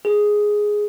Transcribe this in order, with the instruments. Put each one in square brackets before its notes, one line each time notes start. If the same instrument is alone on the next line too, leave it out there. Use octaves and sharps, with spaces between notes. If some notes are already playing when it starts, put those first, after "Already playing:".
[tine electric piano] G#4